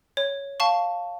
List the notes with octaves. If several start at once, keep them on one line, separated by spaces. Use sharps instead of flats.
C#5
F5 A5 C#6